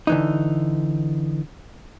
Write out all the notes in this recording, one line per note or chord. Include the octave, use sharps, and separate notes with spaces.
D3 E3 D#4